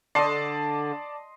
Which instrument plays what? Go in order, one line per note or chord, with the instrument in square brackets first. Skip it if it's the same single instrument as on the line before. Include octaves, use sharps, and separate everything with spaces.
[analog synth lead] D3 [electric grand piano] D5 A5 [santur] D#5 C6